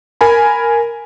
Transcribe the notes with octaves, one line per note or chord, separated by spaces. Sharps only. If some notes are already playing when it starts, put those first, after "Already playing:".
A#4 G#5 B5